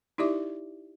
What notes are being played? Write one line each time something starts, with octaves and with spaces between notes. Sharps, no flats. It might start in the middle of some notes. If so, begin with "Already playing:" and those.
D#4 E4 G4 D5 E5 D6